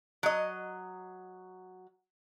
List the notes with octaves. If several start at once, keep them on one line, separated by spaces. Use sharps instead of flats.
F#3 D#5